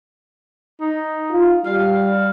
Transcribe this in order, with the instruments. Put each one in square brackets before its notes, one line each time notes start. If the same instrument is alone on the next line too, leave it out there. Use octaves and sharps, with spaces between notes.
[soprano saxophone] D#4
[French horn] F4
[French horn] G3 [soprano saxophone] F5